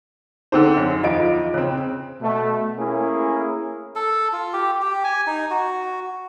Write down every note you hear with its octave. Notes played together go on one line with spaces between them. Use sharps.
D3 C4 D#4 G#4 A#4 C5
F#2
E2 F3 F4 D#5 F5 D7
C#3 C4 C#4 C#5
B2 A3
A3 A#3 C#4 E4 G#4
A4
F4
G4
G4
G#5
D#4
F#4